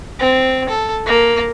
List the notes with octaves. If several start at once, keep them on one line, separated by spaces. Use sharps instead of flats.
C4
A4
A#3